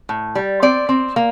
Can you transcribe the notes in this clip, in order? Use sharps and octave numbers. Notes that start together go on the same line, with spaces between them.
A2
G3
C4 D5
C4
A#3